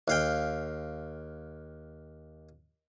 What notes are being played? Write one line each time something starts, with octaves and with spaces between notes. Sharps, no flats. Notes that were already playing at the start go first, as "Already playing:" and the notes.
D#2 F5 G5